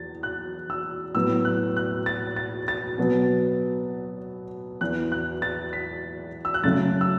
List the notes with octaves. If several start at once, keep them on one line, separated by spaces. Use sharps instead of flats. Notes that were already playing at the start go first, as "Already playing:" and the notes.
Already playing: E2 A6
F#6
E6
A2 F#3 B3 E6
F#6
F#6
A6
A6
A6
B2 F#3 B3
E2 E3 B3 F#6
F#6
A6
B6
E6
F#6
F#2 C#3 F#3 A3 A6
E6